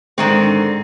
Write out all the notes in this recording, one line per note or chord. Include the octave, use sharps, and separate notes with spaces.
G#2 D3 D#3 G#3 C4